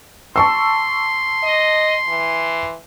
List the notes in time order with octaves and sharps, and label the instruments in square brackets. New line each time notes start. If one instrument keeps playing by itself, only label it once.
[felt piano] A5 C#6 E6 [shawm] C6
[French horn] D#5
E3